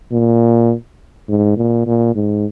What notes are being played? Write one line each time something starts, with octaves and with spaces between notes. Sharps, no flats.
A#2
G#2
A#2
A#2
G#2